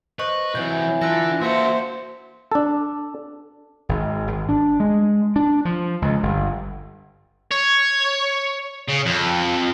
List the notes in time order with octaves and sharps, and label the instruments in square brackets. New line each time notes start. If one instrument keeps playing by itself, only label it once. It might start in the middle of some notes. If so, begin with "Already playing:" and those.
[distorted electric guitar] B4 [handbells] C5 D#5 C#6
[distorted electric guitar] C3 F#3 [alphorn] E3 [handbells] G6
[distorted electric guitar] D4 A4 [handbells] F4 F#6 A#6
[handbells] A#3 E5 C#7 [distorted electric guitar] F#4 A4 [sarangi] C5
[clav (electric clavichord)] D4 A4
[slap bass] G#1
G#1
D4
G#3
D4
F3
C#2
G1
[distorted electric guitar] C#5
C#3
F2